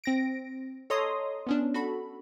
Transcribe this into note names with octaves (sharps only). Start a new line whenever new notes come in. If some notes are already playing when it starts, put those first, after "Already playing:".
C4 A#6 D7
A4 C#5 D#5 A#5 C6 D#6
B3 C#4 D4
F#4 A4 B5